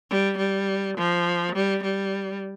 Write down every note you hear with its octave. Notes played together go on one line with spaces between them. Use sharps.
G3
G3
F3
G3
G3